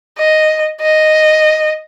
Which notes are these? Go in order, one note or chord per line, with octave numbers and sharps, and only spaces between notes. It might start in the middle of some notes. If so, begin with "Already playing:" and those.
D#5
D#5